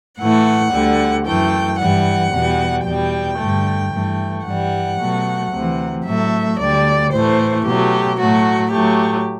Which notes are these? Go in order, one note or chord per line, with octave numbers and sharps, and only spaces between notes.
A2 E3 A3 F#5
D2 D3 G3
F#2 E3 A3 G5
G2 E3 G3 F#5
E2 B2 G3
E2 B2 G3 G5
G2 D3 A3
G2 E3 A3
G2 E3 G3 F#5
B2 F#3 A3
D2 C3 E3
A2 F#3 A3 E5
D2 D3 G3 D5
A2 E3 A3 C5
B2 F#3 A3 G4
A2 F#3 A3 F#4
A2 F#3 A3 G4